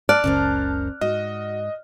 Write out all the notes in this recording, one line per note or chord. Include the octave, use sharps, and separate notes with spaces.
D5 A5 F6 F#6
F#1 C#2 C#4 A#4 C5
G#2 F#4 D#5